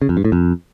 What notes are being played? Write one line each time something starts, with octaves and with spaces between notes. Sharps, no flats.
C#3
F2
G2
A2
F2